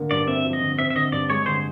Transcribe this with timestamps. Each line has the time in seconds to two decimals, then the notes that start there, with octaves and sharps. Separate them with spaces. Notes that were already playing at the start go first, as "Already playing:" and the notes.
Already playing: D3 A3 A#3
0.11 G2 D5
0.27 C4 E5
0.45 F3
0.53 D#5
0.61 D3
0.78 C4 E5
0.90 E5
0.95 D3 D#5
1.12 G2 D5
1.30 G#3 C#5
1.46 D3 C5